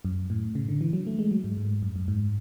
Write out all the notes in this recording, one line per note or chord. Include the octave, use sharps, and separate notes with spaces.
F#2
A2
C#3
D3
E3
F#3
A3
G#3
F#3
G#2
G#2
F#2
F#2
G#2